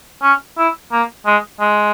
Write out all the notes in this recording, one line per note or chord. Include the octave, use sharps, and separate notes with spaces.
C#4
E4
A#3
G#3
G#3